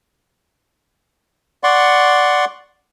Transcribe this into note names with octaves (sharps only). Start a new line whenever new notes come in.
D5 F#5 C6 C#6